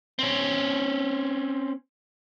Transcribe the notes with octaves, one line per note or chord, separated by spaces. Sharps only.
C4 C#4